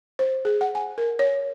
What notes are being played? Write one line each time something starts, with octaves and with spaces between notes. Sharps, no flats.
C5
G#4
F#5
G#5
A#4
C#5